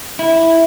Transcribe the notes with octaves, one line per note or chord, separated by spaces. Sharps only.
E4